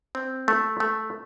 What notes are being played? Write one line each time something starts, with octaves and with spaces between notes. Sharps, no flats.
C4
A3
A3